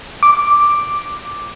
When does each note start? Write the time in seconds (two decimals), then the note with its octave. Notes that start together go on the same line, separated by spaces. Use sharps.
0.23 D6